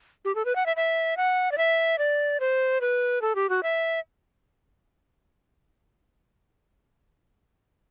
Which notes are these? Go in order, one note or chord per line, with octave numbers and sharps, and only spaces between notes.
G4
A4
B4
F#5
E5
E5
F#5
D5
E5
D5
C5
B4
A4
G4
F#4
E5